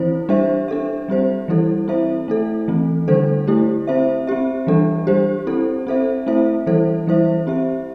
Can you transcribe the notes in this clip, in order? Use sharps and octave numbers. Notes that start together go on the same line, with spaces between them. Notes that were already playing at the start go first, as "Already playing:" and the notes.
Already playing: E3 C4 E4 C5
G3 D4 G4 C5 E5
D4 A4 E5
G3 C4 G4 C5
E3 G3 E4 A4
C4 E4 C5 E5
A3 E4 A4
E3 A3 C4
D3 G3 D4 A4 C5
A3 E4 G4
C4 E4 C5 E5
C4 G4 E5
E3 G3 D4 A4
G3 D4 G4 C5
C4 E4 A4
C4 A4 C5 E5
A3 C4 E4 C5 E5
E3 G3 E4 A4 C5
E3 G3 E4 C5 E5
C4 G4 E5